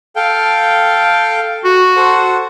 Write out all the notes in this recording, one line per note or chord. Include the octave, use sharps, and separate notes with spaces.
A4 F5 G5
F#4
A4 C5 F#5